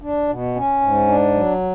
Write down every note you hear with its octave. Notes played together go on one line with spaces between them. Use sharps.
D4
B2
C#4
G#2
D4
F#3